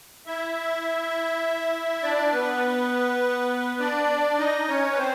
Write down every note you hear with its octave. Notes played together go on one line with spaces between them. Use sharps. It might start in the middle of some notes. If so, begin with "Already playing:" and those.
E4 E5
D4 D5
B3 B4
D4 D5
D#4 D#5
C#4 C#5
B4
C4 C5